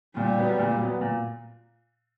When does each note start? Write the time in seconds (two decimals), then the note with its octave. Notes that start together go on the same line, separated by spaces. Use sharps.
0.17 A#2 G3
0.38 F#3 B3
0.59 A#2
0.80 F#3 B3
1.01 A#2